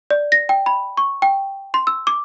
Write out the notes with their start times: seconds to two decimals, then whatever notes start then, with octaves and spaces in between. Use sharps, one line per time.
0.11 D5
0.32 A#6
0.49 G5
0.66 B5
0.97 C#6
1.22 G5
1.74 C6
1.87 E6
2.07 D6